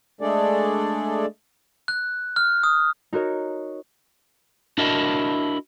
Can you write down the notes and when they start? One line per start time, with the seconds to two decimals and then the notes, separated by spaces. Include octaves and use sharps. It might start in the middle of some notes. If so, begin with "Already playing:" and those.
0.21 G#3 A3 D4 G#4 A4 D5
1.88 F#6
2.36 F6
2.63 D#6
3.13 D#4 F#4 A#4 C#5
4.78 D4 E4 F#4 A#4 D#5 A5